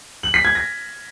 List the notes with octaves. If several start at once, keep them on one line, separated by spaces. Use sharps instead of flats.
F#7
B6
G#6
A#6